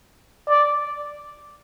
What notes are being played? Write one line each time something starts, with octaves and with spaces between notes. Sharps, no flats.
D5